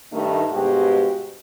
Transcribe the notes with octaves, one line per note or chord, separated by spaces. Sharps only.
G2 D#3 A3
G2 B2 G#3 F#4 G4 C5